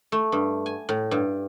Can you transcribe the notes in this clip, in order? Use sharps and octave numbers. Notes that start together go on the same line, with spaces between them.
A3
G2
G#5
A2
G2